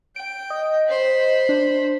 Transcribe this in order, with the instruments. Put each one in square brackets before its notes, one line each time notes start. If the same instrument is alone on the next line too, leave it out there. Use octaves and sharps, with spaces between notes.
[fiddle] G5 [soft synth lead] D7
[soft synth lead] D#5
[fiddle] C5 B5
[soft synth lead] D4